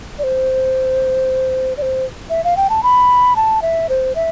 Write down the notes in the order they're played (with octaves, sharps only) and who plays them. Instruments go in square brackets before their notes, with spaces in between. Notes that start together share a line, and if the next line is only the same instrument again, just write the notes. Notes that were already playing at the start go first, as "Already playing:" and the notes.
[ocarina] D5
C5
D5
C5
E5
F5
G5
A5
B5
A5
E5
C5
E5